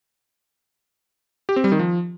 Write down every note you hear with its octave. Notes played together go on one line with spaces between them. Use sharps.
G4
C4
G3
D#3
F3